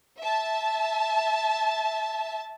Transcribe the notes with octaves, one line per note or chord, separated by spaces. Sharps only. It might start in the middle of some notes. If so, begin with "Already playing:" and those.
E5 A5